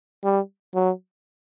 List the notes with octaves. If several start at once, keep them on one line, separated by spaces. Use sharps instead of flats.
G3
F#3